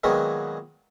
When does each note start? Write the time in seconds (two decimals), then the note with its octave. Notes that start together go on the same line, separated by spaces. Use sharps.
0.04 A#2 D#3 F#3 G#3 B3